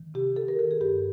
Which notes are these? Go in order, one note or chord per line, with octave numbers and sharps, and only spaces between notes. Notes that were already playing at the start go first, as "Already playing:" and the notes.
Already playing: D#3
C3 G4
D#3 A4
A#4
D#3 A4
G#4
G2 G4